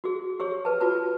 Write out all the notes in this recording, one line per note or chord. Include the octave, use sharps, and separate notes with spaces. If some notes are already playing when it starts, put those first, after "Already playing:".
F#4 G#4
G4 G#4 C#5
B4 A5
F4 F#4 B4 A5